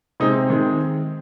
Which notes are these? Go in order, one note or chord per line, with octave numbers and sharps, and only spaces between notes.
C3 G#3 C4 D#4
D#3 G#3 C4